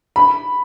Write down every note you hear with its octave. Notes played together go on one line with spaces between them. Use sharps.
B5